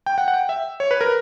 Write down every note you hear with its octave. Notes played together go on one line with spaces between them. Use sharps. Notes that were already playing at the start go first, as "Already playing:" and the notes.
G5
F#5
F#5
G5
E5
C#5
B4
A#4